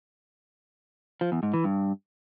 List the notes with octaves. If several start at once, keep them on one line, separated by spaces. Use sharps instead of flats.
F3
E2
G#2
E3
G2